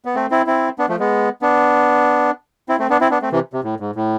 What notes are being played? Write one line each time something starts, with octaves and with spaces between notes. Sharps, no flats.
B3
A3 C4
C4 E4
C4 E4
B3 D4
F3 A3
G#3 B3
B3 D4
C4 E4
A3 C4
B3 D4
C4 E4
B3 D4
A3 C4
C3 E3
C3
A2
G#2
A2